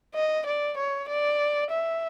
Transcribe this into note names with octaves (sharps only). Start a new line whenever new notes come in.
D#5
D5
C#5
D5
E5